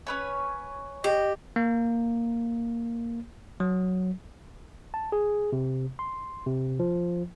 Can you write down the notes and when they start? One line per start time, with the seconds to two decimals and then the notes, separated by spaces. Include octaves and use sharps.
0.07 C#4 B4 C#5
1.04 G4 D#5
1.56 A#3
3.60 F#3
4.94 A5
5.12 G#4
5.52 C3
5.99 C6
6.46 C3
6.79 F3